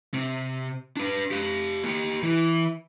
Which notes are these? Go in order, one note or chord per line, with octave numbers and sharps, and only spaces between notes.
C3
D4 B4
G4 F5
A#3 G4
E3